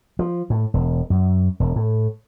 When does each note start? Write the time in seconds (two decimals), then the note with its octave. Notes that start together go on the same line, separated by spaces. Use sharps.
0.19 F3
0.50 A2
0.74 E1
1.10 F#2
1.60 E1
1.76 A2